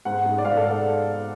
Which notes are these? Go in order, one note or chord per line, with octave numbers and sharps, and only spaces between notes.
G#2 F#5
G#3
D5
G#2 F5
A4